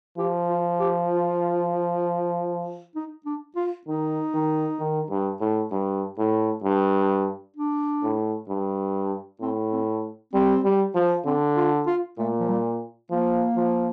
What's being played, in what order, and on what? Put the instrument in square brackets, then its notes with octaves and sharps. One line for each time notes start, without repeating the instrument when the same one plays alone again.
[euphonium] F3 [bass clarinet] G4
[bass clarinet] F4
G4
F4
D#4
D4
F4
[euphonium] D#3 [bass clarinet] D#4
[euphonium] D#3
D#3
G2
A2
G2
A2
G2
[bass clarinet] D4
[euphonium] A2
G2
[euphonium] A2 [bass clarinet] C4
[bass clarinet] C4
[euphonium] G3 [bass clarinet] C4
[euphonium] G3
F3
[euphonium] D3 [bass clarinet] C4
[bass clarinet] F4
F4
[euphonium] A#2 [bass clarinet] A3
[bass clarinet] F3
G3
[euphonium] F3 [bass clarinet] A#3
[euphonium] F3